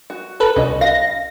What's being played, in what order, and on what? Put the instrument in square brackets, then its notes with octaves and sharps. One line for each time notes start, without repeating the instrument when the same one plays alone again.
[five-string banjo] F#4
[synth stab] A4 B4
[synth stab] C2 [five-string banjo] C#4 F#4 D#5
[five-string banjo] F5 [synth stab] A#6